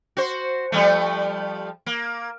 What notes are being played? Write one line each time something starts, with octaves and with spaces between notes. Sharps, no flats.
F#4 C5
F3 G3 A3
A#3